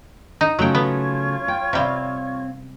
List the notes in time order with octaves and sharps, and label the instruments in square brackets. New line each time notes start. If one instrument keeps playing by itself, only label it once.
[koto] D#4
[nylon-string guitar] C#3 A3 F#4 [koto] F#3 G5 [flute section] F4 C#5 C#6
[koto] B3
[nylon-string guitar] G5
[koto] C3 G3 [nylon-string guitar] C4 F5